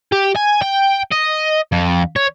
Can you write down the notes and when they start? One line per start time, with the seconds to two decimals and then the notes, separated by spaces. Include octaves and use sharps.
0.12 G4
0.36 G#5
0.62 G5
1.12 D#5
1.72 F2
2.16 C#5